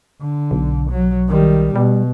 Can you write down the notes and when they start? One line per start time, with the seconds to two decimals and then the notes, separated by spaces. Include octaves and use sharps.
0.21 D3
0.51 B1
0.91 F#3
1.29 D#3 G3
1.76 B2 G3